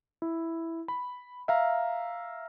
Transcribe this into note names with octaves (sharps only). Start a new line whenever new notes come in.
E4
B5
E5 F5 A#5